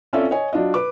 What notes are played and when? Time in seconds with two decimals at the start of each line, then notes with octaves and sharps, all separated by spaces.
0.13 C4 C#4 F4 A4 D5 E5
0.31 C#5 D#5 G#5
0.53 F#3 D4 F4 D#5
0.74 B4 D6